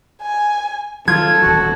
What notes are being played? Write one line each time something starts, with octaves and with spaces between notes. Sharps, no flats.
G#5
D#3 E3 F#3 F4 A4 G#6
D#1 E3 F#4